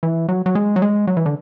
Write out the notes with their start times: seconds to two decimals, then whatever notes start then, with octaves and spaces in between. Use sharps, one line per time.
0.03 E3
0.29 F#3
0.46 F#3
0.55 G#3
0.76 F#3
0.82 G#3
1.07 F#3
1.17 E3
1.26 D3